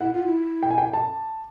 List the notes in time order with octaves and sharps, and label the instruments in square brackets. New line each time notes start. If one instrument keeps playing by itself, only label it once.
[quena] E4 [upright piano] F#5
[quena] F4
E4
[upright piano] G5
G#5
G5
A5